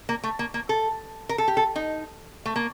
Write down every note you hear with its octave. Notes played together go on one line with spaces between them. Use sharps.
A#3
A3
A#3
A#3
A4
A#4
A4
G4
A4
D#4
A3
A#3